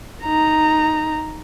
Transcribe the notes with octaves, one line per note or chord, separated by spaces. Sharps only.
D#4 A#5